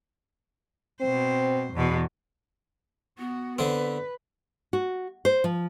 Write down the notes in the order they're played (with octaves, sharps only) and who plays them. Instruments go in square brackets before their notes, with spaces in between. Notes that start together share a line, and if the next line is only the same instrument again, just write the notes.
[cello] B2 C5 [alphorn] C4
[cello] E2 B2
[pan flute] B3 [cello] F#4
[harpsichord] D3 C4 [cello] B4
[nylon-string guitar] F#4
C5
F3